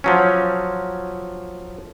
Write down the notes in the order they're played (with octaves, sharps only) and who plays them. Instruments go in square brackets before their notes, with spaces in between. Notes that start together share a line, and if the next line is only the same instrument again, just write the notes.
[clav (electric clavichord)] F3 F#3 C#4